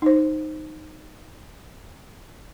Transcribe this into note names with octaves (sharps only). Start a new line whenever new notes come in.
D#4 C5